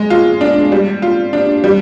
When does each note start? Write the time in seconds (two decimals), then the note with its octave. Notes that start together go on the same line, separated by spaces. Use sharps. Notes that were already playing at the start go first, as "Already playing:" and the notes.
Already playing: G#3
0.10 F4
0.41 D4
0.72 G3
1.02 F4
1.33 D4
1.64 G3